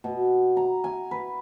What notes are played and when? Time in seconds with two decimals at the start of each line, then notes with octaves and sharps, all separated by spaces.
0.04 B2
0.57 A#5
0.84 G#5
1.11 B4